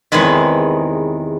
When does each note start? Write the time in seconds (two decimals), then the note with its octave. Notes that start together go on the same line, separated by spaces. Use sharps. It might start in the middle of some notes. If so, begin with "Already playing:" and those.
0.12 E2 C3 D#3 G#3 B4 C#5